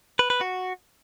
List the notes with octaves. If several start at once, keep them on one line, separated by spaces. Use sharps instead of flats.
B4
B4
F#4